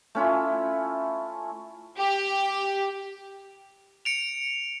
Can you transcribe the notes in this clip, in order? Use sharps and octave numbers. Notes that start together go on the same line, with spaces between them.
A3 C#4 E4 F4
G4
C#7 D7 F7